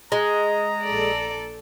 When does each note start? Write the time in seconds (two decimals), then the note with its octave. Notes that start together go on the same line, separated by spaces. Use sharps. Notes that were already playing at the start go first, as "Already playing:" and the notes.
0.12 G#3 A#5
0.84 A#1 A4 D5